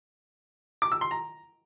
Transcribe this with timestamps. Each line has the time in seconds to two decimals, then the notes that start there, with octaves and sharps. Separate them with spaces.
0.82 D6
0.92 E6
1.01 C6
1.11 A#5